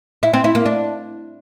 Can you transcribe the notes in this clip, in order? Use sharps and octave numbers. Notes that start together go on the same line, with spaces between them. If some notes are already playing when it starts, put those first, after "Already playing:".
E4
C4
E4
A#3
D4